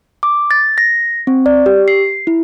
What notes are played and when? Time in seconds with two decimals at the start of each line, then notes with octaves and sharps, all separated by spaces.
0.23 D6
0.51 A6
0.78 A#6
1.27 C4
1.46 D5
1.66 G4
1.88 C7
2.27 E4